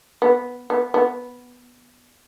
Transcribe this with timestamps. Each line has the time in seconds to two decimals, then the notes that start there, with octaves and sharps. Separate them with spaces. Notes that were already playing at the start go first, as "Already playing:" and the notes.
0.22 B3
0.70 B3
0.94 B3